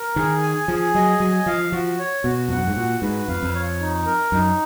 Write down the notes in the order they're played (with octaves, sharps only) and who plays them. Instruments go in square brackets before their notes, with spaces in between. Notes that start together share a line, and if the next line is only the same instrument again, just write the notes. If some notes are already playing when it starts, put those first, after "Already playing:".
Already playing: [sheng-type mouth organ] A#4
[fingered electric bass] D#3 [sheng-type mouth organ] G#4
[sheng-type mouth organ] G#5
[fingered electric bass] F3 [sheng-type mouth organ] G#4
[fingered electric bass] F#3 [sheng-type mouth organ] D#5
[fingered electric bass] F#3 [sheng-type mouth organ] G#5
[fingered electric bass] F3 [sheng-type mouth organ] F5
[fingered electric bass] F3 [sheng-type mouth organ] F#4
[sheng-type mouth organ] C#5
[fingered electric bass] B2 [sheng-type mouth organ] F#4
[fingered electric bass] F2 [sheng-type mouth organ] F#5
[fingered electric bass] F#2
G#2
[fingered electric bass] A#2 [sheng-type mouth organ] F#4
[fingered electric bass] G#2 [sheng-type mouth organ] B4
[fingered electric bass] F2 [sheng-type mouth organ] F5
[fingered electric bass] F2
[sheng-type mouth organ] C#5
D#4
A#4
[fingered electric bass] F#2 [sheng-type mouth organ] D#4